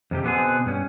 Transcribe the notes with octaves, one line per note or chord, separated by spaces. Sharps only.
F2 C3 G4
B2 D3 B3 C4 G#4
G2 C#4